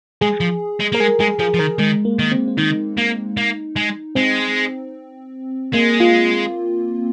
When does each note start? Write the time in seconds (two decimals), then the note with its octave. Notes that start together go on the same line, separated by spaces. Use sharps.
0.21 G#3 G#4
0.40 F3
0.80 G#3
0.92 A#3 A#4
1.00 G#3 G#4
1.20 G#3 G#4
1.39 F3 G#4
1.54 F3
1.59 D#3 A#4
1.79 D#3 G#3
2.05 A#3
2.19 D#3
2.31 C4
2.48 C4
2.57 D#3 D#4
2.98 A#3
3.37 A#3
3.76 G#3
4.15 G#3 C4
5.73 G#3 A#3
6.00 F4